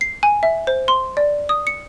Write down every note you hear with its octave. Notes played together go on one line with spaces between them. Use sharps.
C7
G#5
E5
C5
C6
D5
D#6
C#7